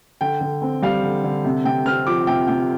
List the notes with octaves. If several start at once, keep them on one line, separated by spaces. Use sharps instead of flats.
D3 G5
D3
C4
G3 F5
D3
D3
C3
C3 G5
C4 F6
F3 D6
C3 G5
C3 G5